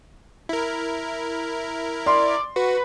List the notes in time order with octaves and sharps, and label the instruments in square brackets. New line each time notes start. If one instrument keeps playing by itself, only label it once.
[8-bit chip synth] E4 A#4
[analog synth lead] D5 [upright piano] C6
[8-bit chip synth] F#4 [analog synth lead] B4